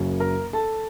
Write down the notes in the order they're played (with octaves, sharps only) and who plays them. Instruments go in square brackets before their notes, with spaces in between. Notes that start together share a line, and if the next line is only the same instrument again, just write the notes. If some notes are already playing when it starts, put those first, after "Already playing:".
Already playing: [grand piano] F#1 F#2 C#3 F#3
A#4 A#5
A4 A5